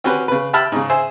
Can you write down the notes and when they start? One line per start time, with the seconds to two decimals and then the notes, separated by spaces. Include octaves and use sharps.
0.04 C4 C#4 F#4 G4 B4
0.28 C#3 B4
0.53 G4 E5 A5 B5 F6
0.72 G#2 C#3
0.90 G#4 C5 E5